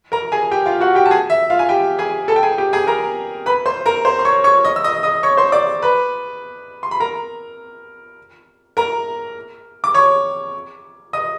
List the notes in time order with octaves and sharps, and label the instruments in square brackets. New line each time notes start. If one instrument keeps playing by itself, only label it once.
[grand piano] A#4 A#5
G#4 G#5
G4 G5
F4 F5
F#4 F#5
G4 G5
A5
G#4 G#5
E5
F4 F5
G#5
G4 G5
G#4 G#5
A4 A5
G5
G#4 G#5
G4 G5
G#4 G#5
A#4 A#5
B4 B5
C5 C6
A#4 A#5
C5 C6
C6
C#5 C#6
C#5 C#6
D#5 D#6
E6
D#5 D#6
D#5 D#6
C#5 C#6
C5 C6
D5 D6
B4 B5
C6
B5
A#4 A#5
A#4 A#5
D6
C#5 C#6
D#5 D#6